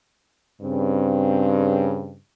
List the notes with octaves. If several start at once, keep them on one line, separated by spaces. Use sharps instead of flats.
G2 C#3 C4